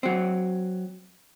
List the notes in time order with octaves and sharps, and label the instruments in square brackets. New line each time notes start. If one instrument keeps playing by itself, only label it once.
[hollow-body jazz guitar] F#3 C4